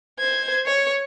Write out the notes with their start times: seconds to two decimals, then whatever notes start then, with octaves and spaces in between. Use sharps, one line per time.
0.19 C5 G#6
0.66 C#5